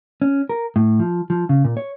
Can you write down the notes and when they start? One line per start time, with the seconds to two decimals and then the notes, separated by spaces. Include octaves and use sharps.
0.22 C#4
0.49 A#4
0.76 A2
0.99 F3
1.30 F3
1.49 C#3
1.64 A#2
1.77 C#5